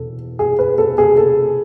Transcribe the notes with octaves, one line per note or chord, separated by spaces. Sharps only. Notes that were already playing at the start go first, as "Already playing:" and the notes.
Already playing: E2 B2 A4
G#4
B4
A4
G#4
A4